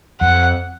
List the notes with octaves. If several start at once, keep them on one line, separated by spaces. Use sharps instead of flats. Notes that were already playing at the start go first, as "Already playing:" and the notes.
F2 F#5